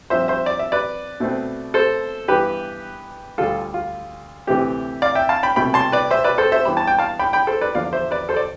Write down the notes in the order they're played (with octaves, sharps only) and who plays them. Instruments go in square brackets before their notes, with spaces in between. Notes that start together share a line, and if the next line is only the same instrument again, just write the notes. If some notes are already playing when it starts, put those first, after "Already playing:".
[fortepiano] G2 F3 C4 C5 E5
C5 E5
D5
E5
B4 D5
B2 A3 C4
A4 C5
G2 E3 B3 G4 B4
D2 D3 G3 F4 A4
F4
D2 C3 E3 A3 C4 G4
D5 F5
E5 G5
F5 A5
G5 B5
C2 B2 A3 G5 B5
A5 C6
B4 D5
C5 E5
B4 D5
A4 C5
C5 E5
G2 E3 B3 B5
A5
G5
F5 A5
G5 B5
G5 B5
A4 C5
B4 D5
E2 D3 F3 D5 F5
C5 E5
B4 D5
A4 C5
D5